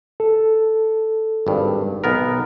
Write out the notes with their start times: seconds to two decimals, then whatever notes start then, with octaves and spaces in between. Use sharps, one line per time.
0.20 A4
1.47 G#1 G2
2.04 B1 B3 A#4